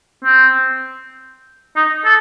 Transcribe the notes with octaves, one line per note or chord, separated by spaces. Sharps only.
C4
D#4
A4